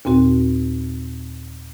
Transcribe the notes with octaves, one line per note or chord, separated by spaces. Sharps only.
D#2 A#2 C4 F#4